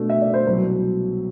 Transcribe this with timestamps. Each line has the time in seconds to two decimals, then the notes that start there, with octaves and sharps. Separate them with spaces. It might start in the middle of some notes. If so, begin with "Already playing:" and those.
Already playing: B2 A3 D4
0.09 E5
0.22 D5
0.34 C5
0.46 C2 B2 F#3 B3 B4